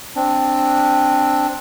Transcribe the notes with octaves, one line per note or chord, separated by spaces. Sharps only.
C4 D4